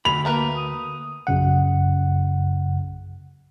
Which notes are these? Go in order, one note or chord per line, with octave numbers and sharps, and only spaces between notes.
D2 B5 F7
A3 A#3 A#4 B4
D#6
A#1 F#2 C#3 F#5